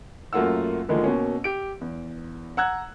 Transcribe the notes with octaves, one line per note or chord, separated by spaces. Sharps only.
F#2 A3 A#3 F4 F#5 E6
D2 D3 D#3 F3 G#3 A#3
B2 A#3 C#4
G4 D7
E2
F#5 A#5 E6 F#6 G#6